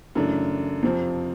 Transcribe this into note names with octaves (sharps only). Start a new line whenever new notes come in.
F#2 C#3 E3 A3 D4
F2 C3 F3